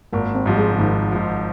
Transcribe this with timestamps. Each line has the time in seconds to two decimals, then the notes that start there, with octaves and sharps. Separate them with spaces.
0.13 G#1 A#3
0.35 C4
0.46 G#2 F3 G3
0.57 G#3
0.71 C#3
0.79 G#1 D#3
1.12 G#2 F3